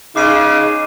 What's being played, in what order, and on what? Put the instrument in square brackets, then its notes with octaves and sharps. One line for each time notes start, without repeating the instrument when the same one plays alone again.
[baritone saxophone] C#3 [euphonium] D#4 [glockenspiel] D6 C7 D#7